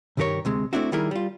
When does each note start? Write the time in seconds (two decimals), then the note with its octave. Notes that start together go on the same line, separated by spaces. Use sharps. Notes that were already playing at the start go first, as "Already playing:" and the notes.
0.17 C2 G2 D#3 G4 A#4 C#5
0.45 D2 C3 G#3
0.73 A3 A#3 C4 D4 E4 F#4
0.92 D#3 G3 E4 G#4 A#4
1.11 G3 F4